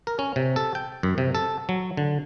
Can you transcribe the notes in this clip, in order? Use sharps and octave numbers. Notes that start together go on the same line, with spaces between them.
A#4
C#4
C3
A4
G5
F#2
C3
A4
F#3
D3